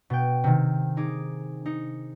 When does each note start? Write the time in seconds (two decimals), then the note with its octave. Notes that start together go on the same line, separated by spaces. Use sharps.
0.10 B2 G5
0.44 C3 D#3
0.97 D#4 G#4 D6
1.66 D#4 C#7